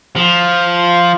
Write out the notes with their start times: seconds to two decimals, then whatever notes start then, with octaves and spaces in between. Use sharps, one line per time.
0.16 F3